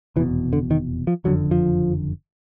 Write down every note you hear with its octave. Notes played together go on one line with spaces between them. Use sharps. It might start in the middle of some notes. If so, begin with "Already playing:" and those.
F1 E2 B2 E3
D3
D#3
F3
F#1 F2 D3 F#3
F3